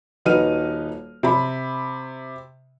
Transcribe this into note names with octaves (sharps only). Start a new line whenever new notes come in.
D#1 D#4 F#4 B4 F6 D#7
C3 B5